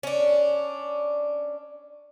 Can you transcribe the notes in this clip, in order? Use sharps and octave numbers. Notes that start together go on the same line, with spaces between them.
C#4 D4